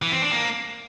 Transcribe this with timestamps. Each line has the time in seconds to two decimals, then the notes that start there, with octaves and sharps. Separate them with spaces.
0.02 E3
0.12 C4
0.22 D4
0.32 A#3